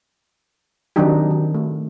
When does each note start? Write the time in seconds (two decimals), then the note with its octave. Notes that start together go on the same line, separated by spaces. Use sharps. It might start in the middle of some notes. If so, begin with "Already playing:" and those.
0.96 D#3 F#3 C4 D4 D#4 G4
1.31 D#3
1.54 A3